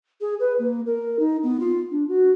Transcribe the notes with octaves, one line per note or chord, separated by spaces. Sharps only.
G#4
B4
A#3
A#4
D#4
B3
F4
D4
F#4